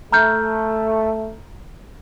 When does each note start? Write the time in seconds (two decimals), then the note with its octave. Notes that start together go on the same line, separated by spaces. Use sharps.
0.12 A3 A#5 F6 G6